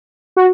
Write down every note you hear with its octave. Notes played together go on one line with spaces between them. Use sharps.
F#4